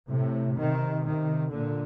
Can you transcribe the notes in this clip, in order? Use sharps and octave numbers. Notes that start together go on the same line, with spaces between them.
A2 C3
C3 D#3
C3 D#3
A#2 D3